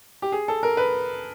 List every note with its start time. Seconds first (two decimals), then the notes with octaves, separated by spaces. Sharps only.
0.22 G4
0.32 G#4
0.48 A4
0.63 A#4
0.77 B4